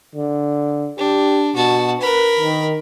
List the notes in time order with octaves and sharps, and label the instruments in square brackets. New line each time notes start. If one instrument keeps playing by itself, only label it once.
[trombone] D3
[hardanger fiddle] D4 [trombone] G4
[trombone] B2 [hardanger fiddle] F#4 A5
[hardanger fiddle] A#4 B5 [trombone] B4
[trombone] D#3